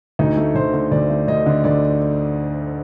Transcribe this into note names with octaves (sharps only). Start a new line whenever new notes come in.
D2 D#4
A3
D2 C5
D3
D2 D5
A3
D2 D#5
D3
D2 D5